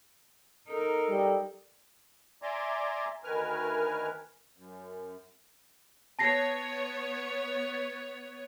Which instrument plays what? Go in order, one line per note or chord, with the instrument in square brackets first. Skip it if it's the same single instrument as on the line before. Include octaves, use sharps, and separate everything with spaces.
[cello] D#4 A#4 [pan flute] A4
[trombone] G3
[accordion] D5 E5 G#5 A#5 C6 D6
D2 D#3 A#4 B4 G#5 F6
F#2
[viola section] B3 C#5 [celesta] A5 A#6 C7